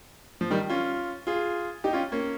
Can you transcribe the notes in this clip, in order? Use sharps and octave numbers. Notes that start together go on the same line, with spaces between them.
F3
D#3 G3
C#4 F4
F4 G#4
D#4 G4
C#4 F4
A#3 C#4